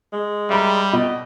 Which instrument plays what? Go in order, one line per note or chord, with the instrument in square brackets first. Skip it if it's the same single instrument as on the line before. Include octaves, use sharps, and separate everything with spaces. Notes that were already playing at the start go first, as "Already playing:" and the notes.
[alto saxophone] G#3
[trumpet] G3 [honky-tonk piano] E5 A#5 B5
[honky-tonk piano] B2 [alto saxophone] D#5